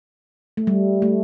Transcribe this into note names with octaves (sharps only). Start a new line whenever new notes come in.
A3
G3
A3